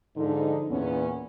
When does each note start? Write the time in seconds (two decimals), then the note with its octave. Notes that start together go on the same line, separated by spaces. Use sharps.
0.16 G#2 D3 F3 D#4
0.69 E2 A#2 B3 C#4